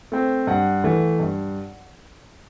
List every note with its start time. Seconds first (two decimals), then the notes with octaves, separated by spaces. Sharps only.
0.12 A3 C4
0.47 G2 F#5
0.84 E3 A3
1.19 G2